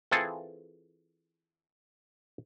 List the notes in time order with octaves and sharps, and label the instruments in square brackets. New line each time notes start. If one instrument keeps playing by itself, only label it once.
[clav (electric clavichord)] E3 C4 F4 G#4 A4